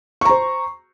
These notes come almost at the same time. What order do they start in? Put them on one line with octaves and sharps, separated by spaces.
C#6 A#5 C5